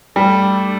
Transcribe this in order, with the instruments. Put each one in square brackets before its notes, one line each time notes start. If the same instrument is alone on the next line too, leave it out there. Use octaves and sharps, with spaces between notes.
[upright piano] G3 [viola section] A3 D4 A4 D5